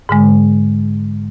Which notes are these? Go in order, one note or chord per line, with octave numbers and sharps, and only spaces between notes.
G#2 D3 G#3